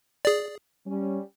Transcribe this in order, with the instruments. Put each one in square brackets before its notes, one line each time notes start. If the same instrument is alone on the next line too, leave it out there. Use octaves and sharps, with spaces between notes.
[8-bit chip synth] G#4 D5
[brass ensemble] G3 C#4